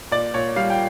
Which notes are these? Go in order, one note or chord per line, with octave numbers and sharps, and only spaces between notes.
A#2 D5
A#2 C#5
G3 F5
G5